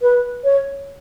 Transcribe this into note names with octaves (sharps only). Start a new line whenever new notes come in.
B4
C#5